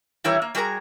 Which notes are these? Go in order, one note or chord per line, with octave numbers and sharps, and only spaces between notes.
E3 G3 E4 A#4 C#5
A#3
G3 F#4 G#4 A#4 A#5